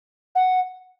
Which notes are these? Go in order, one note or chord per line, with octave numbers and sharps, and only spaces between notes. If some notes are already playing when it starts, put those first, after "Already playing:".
F#5